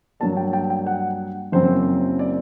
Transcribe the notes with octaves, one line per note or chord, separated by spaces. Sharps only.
G2 F#3 A#3 D4 A5
G5
G5
G5
F#5
F#1 F#2 F#3 C4 C5
D5